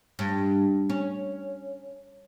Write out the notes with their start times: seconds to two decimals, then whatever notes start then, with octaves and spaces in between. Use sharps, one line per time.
0.19 G2
0.90 C#4